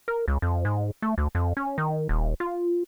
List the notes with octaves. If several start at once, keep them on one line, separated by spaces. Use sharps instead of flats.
A#4
C#2
F2
G#2
A3
D2
F2
C#4
D#3
D#1
F4